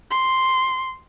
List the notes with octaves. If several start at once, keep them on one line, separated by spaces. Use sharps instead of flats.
C6